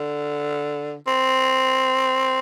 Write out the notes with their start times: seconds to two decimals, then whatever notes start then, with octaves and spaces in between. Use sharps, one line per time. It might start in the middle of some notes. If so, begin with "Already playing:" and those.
Already playing: D3
1.07 C4